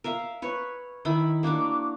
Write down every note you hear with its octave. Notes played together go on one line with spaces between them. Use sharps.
A#4 E5 F5
B4 C#5
D#3 E4 B5
A#3 D4 F#4 D6